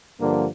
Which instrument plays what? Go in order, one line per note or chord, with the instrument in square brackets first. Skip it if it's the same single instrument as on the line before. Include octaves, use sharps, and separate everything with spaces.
[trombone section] G2 D3 F3 A#3